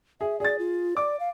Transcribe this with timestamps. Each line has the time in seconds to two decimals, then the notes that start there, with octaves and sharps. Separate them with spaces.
0.21 G#4 E5
0.40 G#4 D5 A6
0.59 F4
0.97 D5 D6
1.20 F5